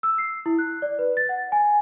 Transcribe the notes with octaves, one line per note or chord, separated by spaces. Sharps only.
E6
C7
E4
F#6
D5
B4
A6
F#5
G#5